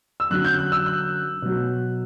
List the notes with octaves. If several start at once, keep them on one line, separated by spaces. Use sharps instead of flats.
E6
F#2 D3 F#3 F#6
G6
F#6
E6
F#6
B2 F#3